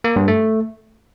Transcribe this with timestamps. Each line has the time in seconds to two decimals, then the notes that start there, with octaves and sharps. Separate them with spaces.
0.04 A#3
0.16 G2
0.28 A3